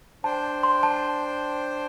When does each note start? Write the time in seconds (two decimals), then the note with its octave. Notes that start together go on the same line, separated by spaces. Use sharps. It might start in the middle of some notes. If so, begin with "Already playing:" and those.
0.24 D4 C5 G5 A5
0.63 C6
0.83 A5